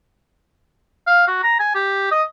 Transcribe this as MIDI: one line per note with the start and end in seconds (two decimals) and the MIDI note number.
1.07 1.26 77
1.28 1.40 66
1.43 1.58 82
1.59 1.74 80
1.75 2.08 67
2.11 2.23 75